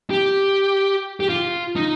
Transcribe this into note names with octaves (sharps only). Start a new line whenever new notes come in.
G4
G4
F4
D#4